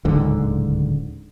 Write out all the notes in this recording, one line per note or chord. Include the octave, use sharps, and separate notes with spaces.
D1 C#2 G#2 D3